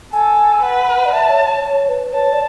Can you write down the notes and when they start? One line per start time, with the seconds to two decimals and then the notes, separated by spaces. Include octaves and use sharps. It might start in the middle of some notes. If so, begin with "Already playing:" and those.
0.12 A4 G#5
0.62 B4 F#5
1.05 D5
1.13 E5 A5
1.30 C#5
1.46 C#5
1.64 C#5
1.89 B4
2.13 C#5 A5
2.32 D5